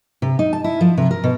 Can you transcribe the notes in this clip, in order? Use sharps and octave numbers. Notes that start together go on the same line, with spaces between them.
C3
D#4
A5
E4
F3
C3
A#4
B2